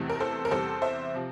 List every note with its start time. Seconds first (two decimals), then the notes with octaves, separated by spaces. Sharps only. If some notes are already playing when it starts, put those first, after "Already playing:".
Already playing: E2 C3 E3 A3 C4
0.10 A#4
0.20 A4 C5
0.45 A#4
0.51 E2 C3 G3 A4 C5
0.82 C5 E5
1.14 C3 F3